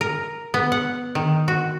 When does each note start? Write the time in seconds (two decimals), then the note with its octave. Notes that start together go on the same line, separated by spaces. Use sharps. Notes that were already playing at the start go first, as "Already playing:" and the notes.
0.01 A#4
0.54 B3
0.72 F#5
1.15 D#3
1.48 F#4